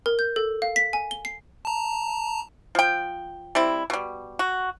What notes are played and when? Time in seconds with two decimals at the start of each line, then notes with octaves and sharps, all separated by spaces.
0.06 A#4
0.19 G6
0.36 A4
0.62 F5
0.76 B6
0.93 G#5
1.11 G7
1.25 C7
1.65 A5 A#5
2.75 F3 G5
3.55 G3 C4 E4
3.90 B2 G3
4.39 F#4